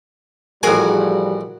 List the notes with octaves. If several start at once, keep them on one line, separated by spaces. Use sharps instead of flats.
A1 F3 G3 F#4 G#4 A#4 G#5